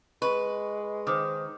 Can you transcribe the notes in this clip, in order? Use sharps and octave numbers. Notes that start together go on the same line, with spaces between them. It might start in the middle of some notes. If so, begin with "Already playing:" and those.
G#3 B4 C#6
D#3 C5 D6 D#6